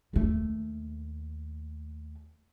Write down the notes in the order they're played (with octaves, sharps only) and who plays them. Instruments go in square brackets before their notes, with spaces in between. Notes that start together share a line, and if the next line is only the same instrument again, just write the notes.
[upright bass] D#2 A3